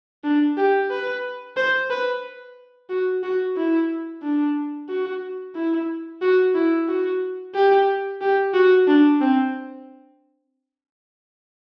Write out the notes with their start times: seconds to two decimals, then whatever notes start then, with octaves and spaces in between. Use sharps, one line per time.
0.24 D4
0.57 G4
0.91 B4
1.57 C5
1.90 B4
2.90 F#4
3.23 F#4
3.57 E4
4.23 D4
4.89 F#4
5.55 E4
6.22 F#4
6.55 E4
6.88 F#4
7.55 G4
8.21 G4
8.54 F#4
8.87 D4
9.21 C4